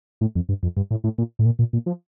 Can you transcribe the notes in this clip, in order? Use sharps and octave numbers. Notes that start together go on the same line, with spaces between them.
A2
F2
G2
F2
G2
A2
A2
A#2
A2
A#2
A#2
A#2
F3